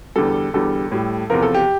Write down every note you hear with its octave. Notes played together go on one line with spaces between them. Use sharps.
E2 D3 G3 A4
E2 D3 G3 A4
A2 G3
E2 C3 F3 A#4
A4
G4